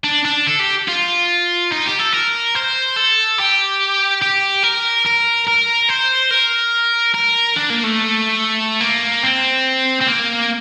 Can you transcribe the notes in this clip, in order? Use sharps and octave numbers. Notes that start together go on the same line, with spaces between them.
D4
D4
A4
G4
F4
D#4
G4
A4
A#4
C5
A4
G4
G4
A#4
A#4
A#4
C5
A#4
A#4
D4
A#3
A3
A#3
C4
C4
A#3